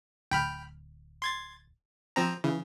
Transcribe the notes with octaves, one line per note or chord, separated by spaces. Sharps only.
D1 G5 B5 F6
C6 G#6 A6
F3 C4 A#5
C#3 E3